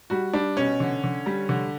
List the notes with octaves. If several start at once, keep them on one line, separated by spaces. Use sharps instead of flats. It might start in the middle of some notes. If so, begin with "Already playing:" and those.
G3 F#4
G3 D4
B2 C#4
D3
D3
G3
D3